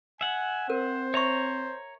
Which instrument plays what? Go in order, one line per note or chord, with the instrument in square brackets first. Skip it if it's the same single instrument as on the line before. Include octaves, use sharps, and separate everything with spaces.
[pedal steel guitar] E5 F#5 [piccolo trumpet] G#5
[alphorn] C4 [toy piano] A#4 [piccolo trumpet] C5
[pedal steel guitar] C#5 A#5 [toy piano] E5 C#6